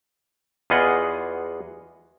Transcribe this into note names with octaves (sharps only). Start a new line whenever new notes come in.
E2 B3 F4 G#4 D#5 F#5